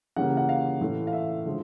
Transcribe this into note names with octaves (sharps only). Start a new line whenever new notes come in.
C#3 E3 G3 A#3 F#5
F#5
F5
A2 E3 A3
F5
E5
D3 F3 G#3